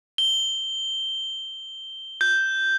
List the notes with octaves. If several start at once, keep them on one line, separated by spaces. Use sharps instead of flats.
G7
G6